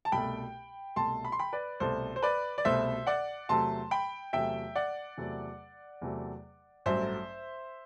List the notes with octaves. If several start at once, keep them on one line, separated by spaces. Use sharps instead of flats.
A5
C2 B2 A3 G5 B5
C2 B2 A3 A5 C6
B5
C6
G5 B5
B4 D5
C2 B2 A3 A4 C5
C5
B4 D5
D5
C2 B2 A3 C5 E5
D5 F#5
E2 C3 F#3 A3 A5 C6
G5 B5
E2 C3 F#3 A3 E5 G5
D5 F#5
E2 C3 F#3 A3
E2 C3 F#3 A3
A1 G2 F#3 A3 C5 E5